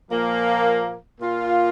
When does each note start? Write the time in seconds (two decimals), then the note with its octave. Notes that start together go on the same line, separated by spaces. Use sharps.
0.10 A#2 F3 A#3
1.19 A#2 A#3 F4